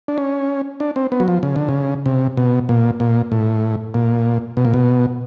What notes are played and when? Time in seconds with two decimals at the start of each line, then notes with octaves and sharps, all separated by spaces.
0.08 D4
0.18 C#4
0.80 D4
0.96 C4
1.12 B3
1.20 F#3
1.28 F3
1.43 C#3
1.56 D3
1.69 C#3
2.06 C3
2.37 B2
2.69 A#2
3.00 A#2
3.32 A2
3.94 A#2
4.57 B2
4.65 A#2
4.74 B2